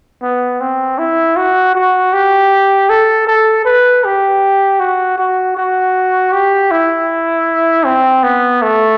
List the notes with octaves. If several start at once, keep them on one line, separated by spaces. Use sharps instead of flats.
B3
C4
E4
F#4
F#4
G4
A4
A4
B4
G4
F#4
F#4
F#4
G4
E4
C4
B3
A3